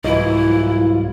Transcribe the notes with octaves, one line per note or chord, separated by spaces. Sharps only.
C2 G#2 E3 F#3 E4 F4 D#5